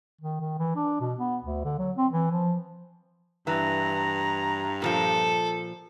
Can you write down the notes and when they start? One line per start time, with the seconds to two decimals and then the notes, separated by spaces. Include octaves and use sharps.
0.21 D#3
0.40 D#3
0.59 E3
0.76 D4
1.00 B2
1.19 B3
1.44 D2
1.64 D3
1.78 F#3
1.97 C4
2.12 E3
2.31 F3
3.47 G2 E3 A#5
4.82 A#2 D#3 F3 A4